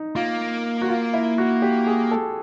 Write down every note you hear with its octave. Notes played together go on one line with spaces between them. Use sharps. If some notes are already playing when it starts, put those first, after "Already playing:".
Already playing: D#4
A#3 F4
F#4
F4
E4
F#4
G4
G#4
A4